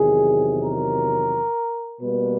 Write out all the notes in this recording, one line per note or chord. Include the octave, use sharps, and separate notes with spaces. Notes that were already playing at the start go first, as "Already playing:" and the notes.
Already playing: E2 C3 D#3 F#3 G#4
A#4
B2 G3 A#3 B4